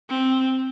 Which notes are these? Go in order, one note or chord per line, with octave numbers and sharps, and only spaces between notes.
C4